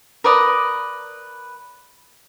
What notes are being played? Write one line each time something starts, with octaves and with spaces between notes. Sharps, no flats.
A#4 B4 D5 D#6